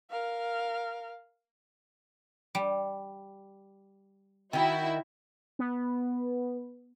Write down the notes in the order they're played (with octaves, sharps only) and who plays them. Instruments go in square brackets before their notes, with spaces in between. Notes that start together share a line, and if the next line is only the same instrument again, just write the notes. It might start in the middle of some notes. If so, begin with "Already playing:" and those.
[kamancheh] A#4 F5
[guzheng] G3
[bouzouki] D#3 G5 [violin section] E4 F#4 E5
[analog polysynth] B3